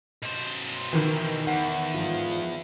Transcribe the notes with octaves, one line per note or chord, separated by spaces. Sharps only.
B2 C5
D#3 E3
E2 F#5
G#2 F3 F4